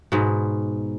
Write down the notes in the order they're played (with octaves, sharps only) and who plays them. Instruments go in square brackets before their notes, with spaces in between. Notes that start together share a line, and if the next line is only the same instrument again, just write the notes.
[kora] G#2 B2